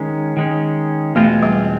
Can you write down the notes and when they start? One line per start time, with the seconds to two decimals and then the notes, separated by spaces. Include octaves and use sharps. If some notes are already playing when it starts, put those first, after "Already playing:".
Already playing: D#3 G#3 C#4
0.37 D#3 G#3 C#4
1.15 E2 B2 G#3 A3 C4 F4
1.43 G3